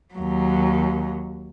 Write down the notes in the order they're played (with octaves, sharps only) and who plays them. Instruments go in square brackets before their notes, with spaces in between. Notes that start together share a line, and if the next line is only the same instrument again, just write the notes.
[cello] D#2 F#3